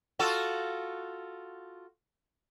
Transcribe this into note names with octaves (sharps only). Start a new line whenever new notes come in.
F4 F#4 A4